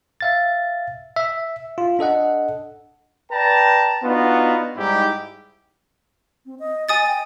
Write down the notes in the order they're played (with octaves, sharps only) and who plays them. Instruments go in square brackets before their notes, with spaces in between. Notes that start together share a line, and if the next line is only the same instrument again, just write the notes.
[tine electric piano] E5 F5 A6
E5
F4
D4 A4 D#5 F#5
[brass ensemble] B4 D5 G5 A5 A#5
B3 D4 D#4 F4 F#4
G#2 G3 D#4 E4 G4
[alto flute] C4
D#5
[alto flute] D#5 [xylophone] G#5 D#6 A6
[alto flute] G5